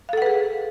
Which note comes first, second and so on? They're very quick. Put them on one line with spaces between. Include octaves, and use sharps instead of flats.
F5 A4 F#5 B4 G#4